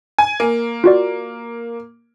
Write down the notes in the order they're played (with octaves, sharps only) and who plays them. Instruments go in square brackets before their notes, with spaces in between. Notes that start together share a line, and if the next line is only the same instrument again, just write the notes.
[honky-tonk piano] G#5
A#3
[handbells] F4 F#4 D5